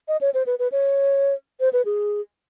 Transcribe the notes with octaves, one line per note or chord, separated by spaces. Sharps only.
D#5
C#5
C5
B4
B4
C#5
C5
B4
G#4